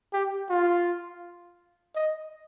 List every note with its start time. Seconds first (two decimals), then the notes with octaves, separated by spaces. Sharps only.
0.13 G4
0.50 F4
1.95 D#5